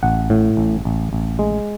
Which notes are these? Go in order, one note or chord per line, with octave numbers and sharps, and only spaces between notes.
A1 F#5
A2
A1
A1
A1
G#3